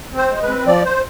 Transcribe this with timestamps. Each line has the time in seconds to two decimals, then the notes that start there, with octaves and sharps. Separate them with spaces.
0.12 C4
0.17 C5
0.30 G#3
0.43 B4
0.48 C4
0.66 F3 D5
0.85 C5